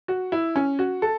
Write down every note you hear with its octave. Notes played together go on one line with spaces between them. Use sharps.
F#4
E4
C#4
F#4
A4